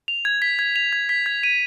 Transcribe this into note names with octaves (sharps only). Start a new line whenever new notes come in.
F7
G#6
B6
G#6
F7
G#6
B6
G#6
D#7